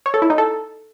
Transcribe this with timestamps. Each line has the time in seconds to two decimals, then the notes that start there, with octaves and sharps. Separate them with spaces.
0.06 C#5
0.14 A4
0.22 E4
0.30 D#4
0.38 A4